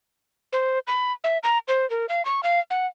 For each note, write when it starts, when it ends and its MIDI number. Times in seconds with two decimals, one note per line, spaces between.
0.53 0.79 72
0.87 1.12 83
1.24 1.38 76
1.43 1.58 82
1.68 1.88 72
1.90 2.06 70
2.09 2.25 77
2.25 2.41 85
2.43 2.60 77
2.70 2.86 78